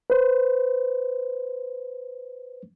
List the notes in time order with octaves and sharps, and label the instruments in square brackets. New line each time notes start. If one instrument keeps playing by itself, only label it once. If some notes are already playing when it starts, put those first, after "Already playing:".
[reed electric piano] B4 C5